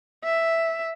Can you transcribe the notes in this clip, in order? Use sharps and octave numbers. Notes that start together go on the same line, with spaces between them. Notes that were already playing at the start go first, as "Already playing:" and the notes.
E5